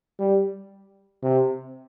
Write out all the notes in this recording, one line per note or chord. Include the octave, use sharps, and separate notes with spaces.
G3
C3